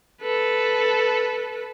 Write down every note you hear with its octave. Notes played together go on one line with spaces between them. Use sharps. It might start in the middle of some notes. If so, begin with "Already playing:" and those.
A4 B4